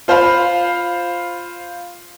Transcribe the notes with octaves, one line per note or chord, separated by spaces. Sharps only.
F4 C5 F5 B5